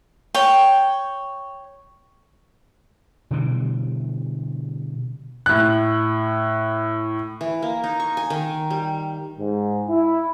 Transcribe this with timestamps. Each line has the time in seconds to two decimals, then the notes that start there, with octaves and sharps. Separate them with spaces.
0.35 C#5 G5
3.31 B2 D3 E3 G3
5.46 A2 F#6
7.41 E3
7.62 A#3
7.84 D#4
8.00 C#6
8.17 G#5
8.30 D#3
8.70 G3
9.38 G#2
9.88 E4